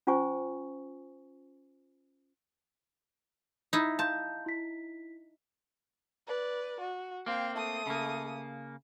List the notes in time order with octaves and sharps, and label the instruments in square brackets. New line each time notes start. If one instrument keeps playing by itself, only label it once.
[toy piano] C#4 F4 C5 G#5 C#6
[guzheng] D#4 E4
[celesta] F5 C6 G6 [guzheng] A5
[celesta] E4 B6
[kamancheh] B4 D5
F#4
[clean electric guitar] A#3 C4 [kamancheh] F5 G5
[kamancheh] A3 D#6
[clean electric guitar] C#3 A#3